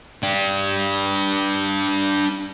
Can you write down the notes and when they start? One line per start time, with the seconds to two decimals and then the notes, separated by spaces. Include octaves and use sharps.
0.23 D4 G4